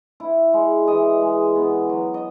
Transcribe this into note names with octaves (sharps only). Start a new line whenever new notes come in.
E4
G#3
E3 D#5
G#3
B3
F#3
D#5